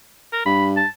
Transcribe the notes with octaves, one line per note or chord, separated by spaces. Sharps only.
A#4
G2 B5
A5